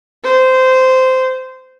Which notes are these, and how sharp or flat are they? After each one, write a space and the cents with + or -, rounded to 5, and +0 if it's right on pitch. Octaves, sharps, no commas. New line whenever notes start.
C5 -15